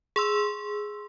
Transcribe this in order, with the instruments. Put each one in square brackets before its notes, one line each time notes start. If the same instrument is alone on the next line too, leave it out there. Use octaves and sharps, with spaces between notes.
[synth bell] G#4 C6 E6